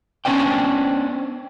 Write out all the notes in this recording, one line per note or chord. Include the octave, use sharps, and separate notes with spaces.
B3 C#4 D4 C5 D5 G5